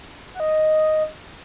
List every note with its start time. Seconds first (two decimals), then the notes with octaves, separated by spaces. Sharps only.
0.34 F#5
0.40 D#5